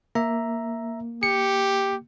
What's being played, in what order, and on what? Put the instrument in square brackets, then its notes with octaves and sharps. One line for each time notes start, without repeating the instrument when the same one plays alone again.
[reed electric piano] A#3 [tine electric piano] E5 A#5
[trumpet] G4 [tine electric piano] C#7